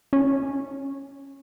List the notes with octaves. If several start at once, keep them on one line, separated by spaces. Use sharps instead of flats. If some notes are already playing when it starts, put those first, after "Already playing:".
C#4